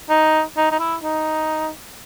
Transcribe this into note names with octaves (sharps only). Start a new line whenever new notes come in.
D#4
D#4
D#4
E4
D#4